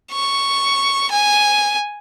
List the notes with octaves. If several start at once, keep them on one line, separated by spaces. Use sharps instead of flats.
C#6
G#5